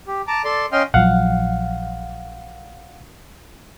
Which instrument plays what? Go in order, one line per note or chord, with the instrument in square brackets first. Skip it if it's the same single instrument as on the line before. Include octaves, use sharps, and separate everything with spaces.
[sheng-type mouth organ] G4
A5 A#5 D6
A4 D5 C6
C#4 D#5 F5 G5 C6 F6
[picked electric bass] A#1 F3 F#3 [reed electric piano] F5 F#5